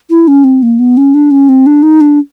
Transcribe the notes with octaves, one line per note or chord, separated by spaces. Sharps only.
E4
C#4
C4
A#3
B3
C#4
D4
C#4
C4
D4
D#4
D4